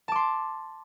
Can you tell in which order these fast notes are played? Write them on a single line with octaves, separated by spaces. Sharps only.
A5 D6 C6